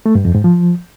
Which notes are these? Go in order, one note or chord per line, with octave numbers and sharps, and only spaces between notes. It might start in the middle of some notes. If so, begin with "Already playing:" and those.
A3
G2
F2
G#2
F3